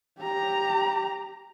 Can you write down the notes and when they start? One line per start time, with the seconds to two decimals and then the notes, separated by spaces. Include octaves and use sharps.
0.20 G4 A#5